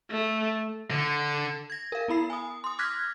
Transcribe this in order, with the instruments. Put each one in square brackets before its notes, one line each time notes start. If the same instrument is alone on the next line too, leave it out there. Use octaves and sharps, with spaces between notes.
[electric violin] A3
[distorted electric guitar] D3
[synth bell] G#6 A#6
A#4 F5
B3 E4 B5 C7
G#5 D#6
C6 D#6
D6 F6 F#6 G#6 A#6 B6